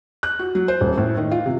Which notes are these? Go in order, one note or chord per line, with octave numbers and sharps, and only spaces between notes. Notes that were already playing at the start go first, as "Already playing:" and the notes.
F#6
F#4
F#3
C5
D#1
A2
D#3
F4
C3